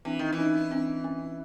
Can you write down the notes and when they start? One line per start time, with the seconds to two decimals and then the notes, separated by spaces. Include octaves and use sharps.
0.05 E3 C4 D4
0.19 D#3
0.33 E3
0.38 C#4 D#4
0.71 C4 D4
1.04 C#4